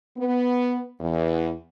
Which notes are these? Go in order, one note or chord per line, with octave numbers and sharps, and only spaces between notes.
B3
E2